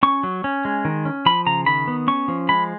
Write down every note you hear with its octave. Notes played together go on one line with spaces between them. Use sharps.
C#4 C#6
F#3
C#4
G#3
D#3
C#4
F3 B5
C#3 A#5
D#3 B5
B3
C#4 C#6
F3
G#3 B5